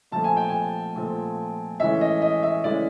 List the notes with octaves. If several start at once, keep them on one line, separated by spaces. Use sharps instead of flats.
A#2 F3 A3 C4 A5
G#5
G5
G#5
A#2 F3 A3 C4
A2 E3 G#3 C#4 E5
D#5
D#5
E5
A2 E3 G#3 C#4 D5